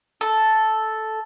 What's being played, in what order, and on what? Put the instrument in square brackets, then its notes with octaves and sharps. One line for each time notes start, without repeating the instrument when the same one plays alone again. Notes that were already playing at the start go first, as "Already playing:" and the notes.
[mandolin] A4